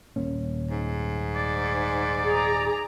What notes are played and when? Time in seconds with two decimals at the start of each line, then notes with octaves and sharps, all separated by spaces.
0.16 D#1 A#3 C#4
0.71 G#2
1.36 D5
2.25 G#4 A#5